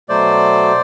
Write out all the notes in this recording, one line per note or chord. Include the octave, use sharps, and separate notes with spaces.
B2 F#3 A3 C5 D5